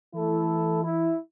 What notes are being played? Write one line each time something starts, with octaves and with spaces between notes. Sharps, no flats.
E3 A3 E4 A4
E4